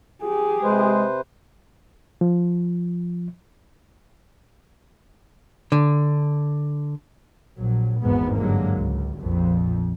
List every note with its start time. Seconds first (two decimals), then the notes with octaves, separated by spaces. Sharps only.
0.23 G4 G#4
0.63 C3 G#3 B4 C5
2.21 F3
5.72 D3
7.58 A#1 F#3
8.01 G#1 E2 G#2 B3
8.37 G2 D3 F#3 G#3 A#3
8.75 C#2
9.20 A#1 F2